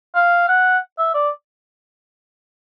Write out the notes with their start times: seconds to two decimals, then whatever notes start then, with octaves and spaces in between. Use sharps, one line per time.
0.15 F5
0.48 F#5
0.98 E5
1.14 D5